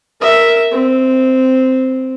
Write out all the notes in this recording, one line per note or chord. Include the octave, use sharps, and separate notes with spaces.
A#4 E5
C4